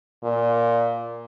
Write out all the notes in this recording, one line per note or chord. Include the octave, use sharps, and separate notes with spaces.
A#2